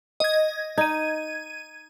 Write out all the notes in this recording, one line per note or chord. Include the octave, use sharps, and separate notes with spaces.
D#5 G#6
D#4 G#6 D#7